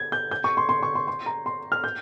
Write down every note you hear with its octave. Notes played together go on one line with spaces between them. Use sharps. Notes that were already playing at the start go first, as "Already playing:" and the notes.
Already playing: G#6
G6
G6
C#6
C6
C6
C#6
C6
C6
A#5
C6
F6
G6